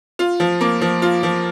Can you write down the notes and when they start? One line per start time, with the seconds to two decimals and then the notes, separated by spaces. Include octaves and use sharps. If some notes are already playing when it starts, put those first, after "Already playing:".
0.19 F4
0.40 F3
0.61 A#3
0.81 F3
1.02 F4
1.23 F3